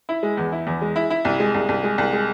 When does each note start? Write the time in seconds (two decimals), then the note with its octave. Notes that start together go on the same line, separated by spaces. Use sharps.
0.09 E4
0.23 G#3
0.37 E2
0.52 E4
0.67 E2
0.82 G#3
0.96 E4
1.10 E4
1.25 C2
1.40 G#3
1.54 C2
1.69 C2
1.83 G#3
1.98 C2
2.13 G#3